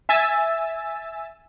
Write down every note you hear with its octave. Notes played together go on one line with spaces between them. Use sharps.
E5 G#5 E6 A6